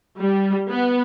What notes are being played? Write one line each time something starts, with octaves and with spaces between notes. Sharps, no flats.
G3
B3